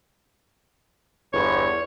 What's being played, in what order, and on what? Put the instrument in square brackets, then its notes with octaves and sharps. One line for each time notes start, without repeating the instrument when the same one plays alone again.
[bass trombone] G1 [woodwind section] E2 [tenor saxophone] C#5